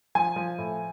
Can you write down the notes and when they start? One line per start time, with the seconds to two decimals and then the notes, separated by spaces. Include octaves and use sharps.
0.15 F3 G#5
0.36 F3
0.58 A2